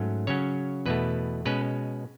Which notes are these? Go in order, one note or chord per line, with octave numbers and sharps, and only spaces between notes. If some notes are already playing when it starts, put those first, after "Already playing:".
Already playing: G#2 F#3 A3 C#4
C#3 F#3 C#4 C#5
E2 B2 A3 B4
B2 G#3 C#4 B4